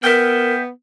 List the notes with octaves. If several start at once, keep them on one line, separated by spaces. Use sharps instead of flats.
B3 A#4 E5 G5